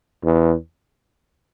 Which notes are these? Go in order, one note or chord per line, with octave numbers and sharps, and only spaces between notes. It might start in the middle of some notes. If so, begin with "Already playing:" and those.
E2